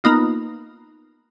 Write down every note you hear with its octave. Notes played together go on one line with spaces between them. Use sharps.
A#3 B3 D#4 F4